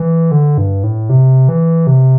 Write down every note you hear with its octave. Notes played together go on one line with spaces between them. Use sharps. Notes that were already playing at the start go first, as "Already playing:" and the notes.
Already playing: E3
D3
G2
A2
C3
E3
C3